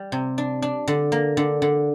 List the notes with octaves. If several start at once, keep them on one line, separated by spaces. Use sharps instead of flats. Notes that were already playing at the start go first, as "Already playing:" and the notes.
Already playing: G3
C3
D4
D4
D3
A#3
D3
D3